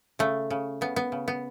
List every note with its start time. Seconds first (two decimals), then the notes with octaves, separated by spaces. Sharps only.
0.19 C#3 A3
0.50 C#3
0.81 C#3 B3
0.96 B3
1.12 C#3
1.28 B3